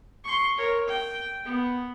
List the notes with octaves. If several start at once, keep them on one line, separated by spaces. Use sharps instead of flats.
C6 C#6
A#4 C#5
G5
B3